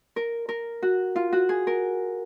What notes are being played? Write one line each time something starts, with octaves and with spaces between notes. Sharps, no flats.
A#4
A#4
F#4
F4
F#4
G#4
A#4